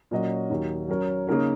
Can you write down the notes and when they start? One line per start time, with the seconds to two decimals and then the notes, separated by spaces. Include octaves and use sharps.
0.11 A#2 F#3 C#4 F#4 D#5
0.50 D#2 D#3 F#3 D#4
0.88 F#3 C#4 A#4 C#5
1.27 C#3 A#3 D#4 A#4 C#5